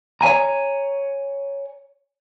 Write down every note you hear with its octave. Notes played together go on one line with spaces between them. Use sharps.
C#5 E5 G#5 A#5